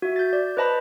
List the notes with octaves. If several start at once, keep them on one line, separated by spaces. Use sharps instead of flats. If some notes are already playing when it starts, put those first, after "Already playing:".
F#4 E5
G6 A6
D5
B4 C5 D#5 A5 B5